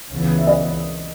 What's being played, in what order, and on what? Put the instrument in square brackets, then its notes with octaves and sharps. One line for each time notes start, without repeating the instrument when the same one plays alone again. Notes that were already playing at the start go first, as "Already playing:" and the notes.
[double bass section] C#2 C#3 E3 B3
[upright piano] E5
D#5